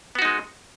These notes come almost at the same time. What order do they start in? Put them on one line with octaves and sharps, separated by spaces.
B3 F#4 D#4 G#3